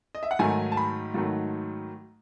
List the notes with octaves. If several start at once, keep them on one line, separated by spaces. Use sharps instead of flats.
D#5
E5
F#5
G#2 D#3 F#3 A3 G#5
A5
B5
G#2 D#3 F#3 A3